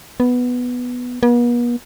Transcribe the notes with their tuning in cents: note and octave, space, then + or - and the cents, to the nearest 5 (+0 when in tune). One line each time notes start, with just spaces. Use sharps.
B3 +0
B3 -45